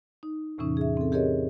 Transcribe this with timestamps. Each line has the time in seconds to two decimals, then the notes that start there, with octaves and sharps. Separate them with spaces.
0.23 D#4
0.58 E2 A2 C3 E3 C#4 D#4
0.77 G#4 E5
0.97 C4 A4
1.12 G4 G#4 A#4 C#5 D#5